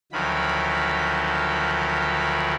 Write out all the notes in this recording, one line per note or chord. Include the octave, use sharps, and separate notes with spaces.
D2 D#3 F3 F#3 B5